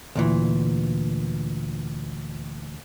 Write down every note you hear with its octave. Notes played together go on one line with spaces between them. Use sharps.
D2 A#2 E3